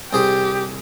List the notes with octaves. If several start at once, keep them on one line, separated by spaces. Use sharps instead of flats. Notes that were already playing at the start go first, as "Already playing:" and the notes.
C2 G4 G#4 C5